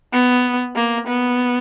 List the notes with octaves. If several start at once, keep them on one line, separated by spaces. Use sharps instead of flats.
B3
A#3
B3